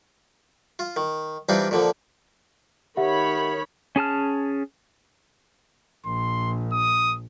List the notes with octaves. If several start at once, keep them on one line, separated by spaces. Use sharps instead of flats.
F4
D#3
E3 G3 C4 D4 D#4 F4
A#2 D3 F3
D#3 G4 C#5 E5 F#5 B5
C#4 G#4 A5 F6
A#1 C6
D#6